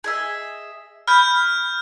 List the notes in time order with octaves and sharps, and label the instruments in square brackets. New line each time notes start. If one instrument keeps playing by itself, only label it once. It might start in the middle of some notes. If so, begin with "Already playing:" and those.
[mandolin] G#4 D#5 E5
[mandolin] B5 [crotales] F6 G6